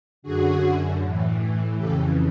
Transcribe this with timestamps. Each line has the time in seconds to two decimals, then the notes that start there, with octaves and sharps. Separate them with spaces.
0.22 F#2 D3 F#4 G#4
1.00 A2 E3
1.77 F2 C#3 E3 G4 A4